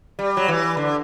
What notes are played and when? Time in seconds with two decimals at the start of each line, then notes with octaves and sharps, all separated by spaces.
0.19 G3
0.37 F#3
0.48 E3
0.77 D3